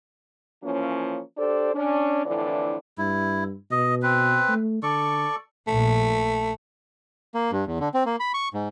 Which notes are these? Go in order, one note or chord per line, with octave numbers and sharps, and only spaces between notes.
E3 F3 A#3 C#4
D4 G4 A4 C5 D5
C#4 D4
F2 A2 D3 E3 D4 D5
G2 E4
B2 D#5
C4 B4
A3
D3 A4 D5 C#6
A#1 A3
A#3
G2
E2
D3
C4
A#3
B5
C#6
G#2